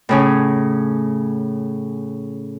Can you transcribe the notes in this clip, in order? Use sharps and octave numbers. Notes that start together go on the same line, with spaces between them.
A2 C#3 C#4